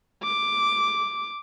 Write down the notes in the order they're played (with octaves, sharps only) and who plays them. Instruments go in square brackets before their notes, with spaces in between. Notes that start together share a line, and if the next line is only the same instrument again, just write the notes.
[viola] D6